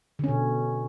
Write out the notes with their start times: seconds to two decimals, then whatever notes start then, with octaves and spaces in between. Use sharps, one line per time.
0.19 D3
0.24 C#4
0.28 B2